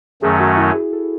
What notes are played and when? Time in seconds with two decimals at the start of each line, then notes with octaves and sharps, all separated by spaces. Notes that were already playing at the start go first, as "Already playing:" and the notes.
0.22 F#2 D#3 F#3 A3 C#4 G#4
0.40 F#4
0.57 E4
0.74 G#4
0.93 A4